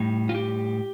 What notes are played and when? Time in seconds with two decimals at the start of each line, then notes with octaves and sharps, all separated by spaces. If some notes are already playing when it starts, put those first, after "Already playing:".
Already playing: A2 G3
0.29 F4
0.35 G4